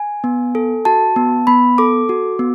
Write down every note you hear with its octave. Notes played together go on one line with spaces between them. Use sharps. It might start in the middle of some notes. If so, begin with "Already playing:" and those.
Already playing: G#5
B3
A4
F#4 A5
B3
B3 B5
A4 D6
F#4
B3